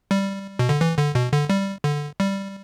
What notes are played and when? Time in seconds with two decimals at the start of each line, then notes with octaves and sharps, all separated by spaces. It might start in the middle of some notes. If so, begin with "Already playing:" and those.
0.11 G3
0.59 B2
0.69 D3
0.81 E3
0.98 D3
1.15 B2
1.32 D3
1.50 G3
1.84 D3
2.20 G3